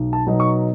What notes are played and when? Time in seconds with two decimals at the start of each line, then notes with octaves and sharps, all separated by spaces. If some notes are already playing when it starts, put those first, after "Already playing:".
Already playing: B1
0.13 A5
0.27 B2 F#3 B3 D#4
0.40 C#6